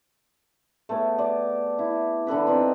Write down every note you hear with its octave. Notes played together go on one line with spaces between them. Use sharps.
A3 B3 G#4 C#5
D5
E4
D3 E3 A4 B4
C4 D#4 B4 D5